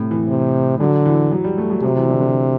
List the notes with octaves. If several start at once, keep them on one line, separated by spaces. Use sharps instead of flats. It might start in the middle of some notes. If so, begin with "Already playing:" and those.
Already playing: A2 C3
E3
C3
D3 F#3
E3
F#3
G3
A3
F#3
G3
C3 F#3
E3
D3
D3